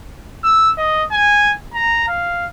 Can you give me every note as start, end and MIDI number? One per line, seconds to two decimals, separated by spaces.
0.44 0.71 88
0.77 1.04 75
1.12 1.54 80
1.74 2.07 82
2.08 2.47 77